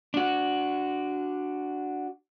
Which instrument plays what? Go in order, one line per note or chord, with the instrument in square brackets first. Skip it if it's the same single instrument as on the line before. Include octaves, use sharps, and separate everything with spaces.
[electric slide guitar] D4 F#4